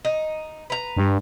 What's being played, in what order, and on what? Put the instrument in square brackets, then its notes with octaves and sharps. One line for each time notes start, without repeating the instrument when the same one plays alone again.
[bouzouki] D#4
B4 A#5
[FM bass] G2